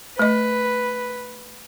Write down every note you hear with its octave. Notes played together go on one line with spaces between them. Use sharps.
A3 B4 D#5